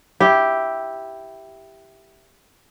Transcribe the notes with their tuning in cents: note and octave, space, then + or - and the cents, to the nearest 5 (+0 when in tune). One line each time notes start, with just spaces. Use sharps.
E4 +0 G4 +0